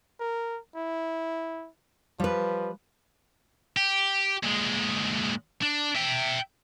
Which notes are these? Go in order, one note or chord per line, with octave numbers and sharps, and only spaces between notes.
A#4
E4
F3 G3 B4
G4
A#2 G#3
D4
E5 G5